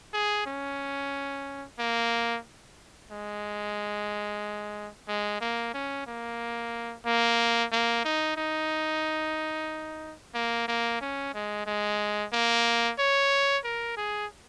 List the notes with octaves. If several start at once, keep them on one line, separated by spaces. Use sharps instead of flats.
G#4
C#4
A#3
G#3
G#3
A#3
C#4
A#3
A#3
A#3
D#4
D#4
A#3
A#3
C#4
G#3
G#3
A#3
C#5
A#4
G#4